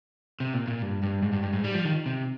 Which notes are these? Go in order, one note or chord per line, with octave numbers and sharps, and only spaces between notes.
C3
A#2
A#2
G2
G2
G#2
G2
G2
G#2
G3
F3
D#3
C3